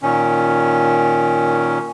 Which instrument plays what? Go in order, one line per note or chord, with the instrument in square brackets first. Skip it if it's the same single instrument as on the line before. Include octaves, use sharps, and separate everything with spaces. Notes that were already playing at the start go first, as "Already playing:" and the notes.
[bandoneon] A#2 D#3 C#4